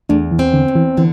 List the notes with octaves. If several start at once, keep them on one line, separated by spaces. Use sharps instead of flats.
E2 A3 D4
E3
C4
D3
E2
E3
D3 E3